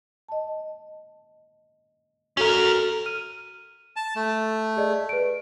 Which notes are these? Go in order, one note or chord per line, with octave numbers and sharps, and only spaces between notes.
D#5 A5
C#4 F#4 A4 A#4
F6 D#7
A5
A3
G#4 D5 D#5
B4 D7